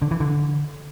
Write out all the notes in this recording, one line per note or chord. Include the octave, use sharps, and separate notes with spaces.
D3
E3
D3